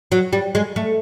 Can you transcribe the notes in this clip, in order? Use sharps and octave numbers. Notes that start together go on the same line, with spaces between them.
F#3
G3
G#3
A3